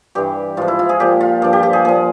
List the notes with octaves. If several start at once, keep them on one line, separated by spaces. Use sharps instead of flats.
G2 E3 G4
G#2 F3 F4
E4
F4
G#4
A#2 F3 G4
F4
G2 F3 G4
G4
G4
G#4
A#2 F3 G#4